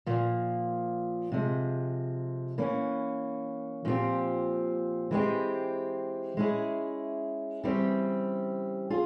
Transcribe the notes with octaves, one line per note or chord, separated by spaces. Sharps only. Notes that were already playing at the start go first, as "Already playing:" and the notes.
A#2 F3 A#3
C3 F3 G#3
E3 A#3 C#4
A#2 F3 C4 G4
E3 G#3 C4 G4
G#3 C#4 E4 G#4
C#3 E3 G3 C4 G4
F4 G#4